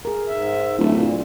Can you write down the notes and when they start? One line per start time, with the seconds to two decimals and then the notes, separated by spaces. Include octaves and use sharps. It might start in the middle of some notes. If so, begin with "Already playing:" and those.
0.05 G#4 A#4
0.28 G#2 E5
0.79 D1 G2 E3 A3
0.94 A#2 D4 F4